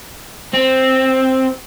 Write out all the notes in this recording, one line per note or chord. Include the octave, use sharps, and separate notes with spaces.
C4